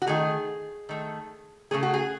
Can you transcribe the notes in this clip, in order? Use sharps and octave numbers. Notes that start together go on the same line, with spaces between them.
F#4
D#3 A3 G#4
D#3 A3
C#3 E3 A3 G#4
F#4
G#4